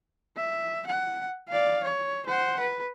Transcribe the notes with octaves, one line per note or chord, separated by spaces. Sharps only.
E5
F#5
D5 F5
C#5
C5 F#5
B4